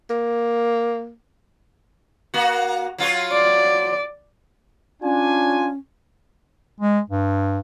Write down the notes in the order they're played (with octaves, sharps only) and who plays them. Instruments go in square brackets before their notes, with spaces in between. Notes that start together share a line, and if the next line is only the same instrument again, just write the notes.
[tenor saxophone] A#3
[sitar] A#3 F#4
F#3 F4 C#5
[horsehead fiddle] D5
[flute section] C#4 [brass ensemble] D4 F4 G#5
[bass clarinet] G#3
G2